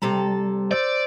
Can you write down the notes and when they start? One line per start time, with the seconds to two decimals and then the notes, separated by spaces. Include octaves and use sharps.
0.02 C3 G3 A4 A#5
0.71 C5 D5 E6